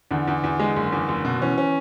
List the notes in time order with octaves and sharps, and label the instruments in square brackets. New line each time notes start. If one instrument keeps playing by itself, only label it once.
[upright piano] E2 [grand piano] D3
[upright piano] E2
E2
G#3
F#1
E2
F#1
B2
[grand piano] E3 [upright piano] C#4
[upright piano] C#4